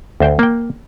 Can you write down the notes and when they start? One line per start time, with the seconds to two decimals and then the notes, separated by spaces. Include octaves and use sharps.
0.20 D2 C5 G5
0.39 A#3 G5